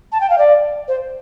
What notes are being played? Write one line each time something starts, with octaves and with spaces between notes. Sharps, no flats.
A5
G5
F5
D5
C5